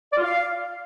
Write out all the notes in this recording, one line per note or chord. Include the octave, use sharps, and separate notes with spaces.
D5
F4
F5